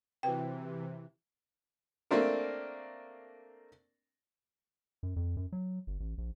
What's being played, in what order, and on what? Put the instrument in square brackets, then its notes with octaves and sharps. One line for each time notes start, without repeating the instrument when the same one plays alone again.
[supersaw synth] C3 E3 [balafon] F#4 B4 G5
[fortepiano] A3 A#3 C4 D4 A#4
[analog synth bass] F#2
F2
F#2
F#3
G1
A1
A#1